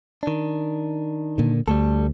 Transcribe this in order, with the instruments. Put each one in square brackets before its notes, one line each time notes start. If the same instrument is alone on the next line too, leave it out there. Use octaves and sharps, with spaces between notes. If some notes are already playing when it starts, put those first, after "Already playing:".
[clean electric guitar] D#3 D4
[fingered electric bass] A#2 D3
[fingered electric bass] D2 [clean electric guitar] G3 A3 A4